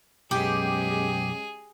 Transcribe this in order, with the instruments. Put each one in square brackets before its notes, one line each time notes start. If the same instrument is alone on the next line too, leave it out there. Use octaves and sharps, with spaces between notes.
[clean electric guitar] B1 F#2 B3 [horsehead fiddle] G#3 C#4 [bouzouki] G4 [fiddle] G#4